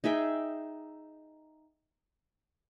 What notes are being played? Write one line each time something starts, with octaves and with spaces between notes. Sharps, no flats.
D#4 G#4 E5 G5